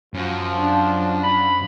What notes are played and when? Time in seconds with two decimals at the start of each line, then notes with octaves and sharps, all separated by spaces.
0.15 F#2 F3
0.60 D4
1.23 B5